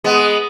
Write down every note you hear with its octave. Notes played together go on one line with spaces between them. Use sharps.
G#3 B3